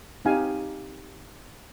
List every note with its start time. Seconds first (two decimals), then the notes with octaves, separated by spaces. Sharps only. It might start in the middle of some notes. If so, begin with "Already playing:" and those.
0.25 C4 D#4 G4 F5 G#5